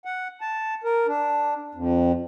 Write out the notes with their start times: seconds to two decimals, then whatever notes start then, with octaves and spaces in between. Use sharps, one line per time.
0.05 F#5
0.41 A5
0.84 A#4
1.07 D4
1.75 F2